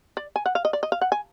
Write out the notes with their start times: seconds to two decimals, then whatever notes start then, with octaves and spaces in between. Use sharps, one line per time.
0.17 D5
0.36 G#5
0.46 F#5
0.55 F5
0.65 D#5
0.73 D5
0.83 D#5
0.92 F5
1.01 F#5
1.12 G#5